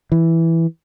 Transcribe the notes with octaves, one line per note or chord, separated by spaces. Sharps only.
E3